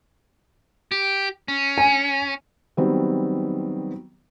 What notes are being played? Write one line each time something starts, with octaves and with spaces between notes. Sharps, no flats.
G4
C#4
G#5
D#3 F#3 G3 B3 C4